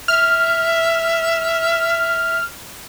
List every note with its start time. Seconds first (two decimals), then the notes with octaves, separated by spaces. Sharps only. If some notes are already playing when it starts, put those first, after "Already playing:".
0.08 E5 F6